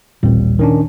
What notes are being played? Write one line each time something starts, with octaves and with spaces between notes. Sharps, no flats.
A1 D#2 A#2 G3 C4
D#3 C#4 D4